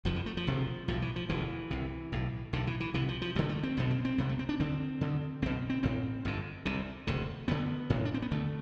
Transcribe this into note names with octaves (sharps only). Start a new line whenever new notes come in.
F1 F2 D3 F3
E3
A3
F3
E1 D2 C3
B1 A2 F3
E3
F3
E1 D2 D3 E3
C2 C3
B1 A2
B1 A2 D3
E3
E3
C2 C3 E3
F3
F3
D2 D3 G3
A3
C4
B1 B2 B3
C4
C4
C2 C3 B3
A3
C4
D4
D2 D3 C4
D2 D3
B1 B2 C4
C4
A1 A2 C4
G1 F2 D3
C2 C3
E1 D2 C3
D2 D3 B3
A1 A2
D4
C4
B3
D2 D3 A3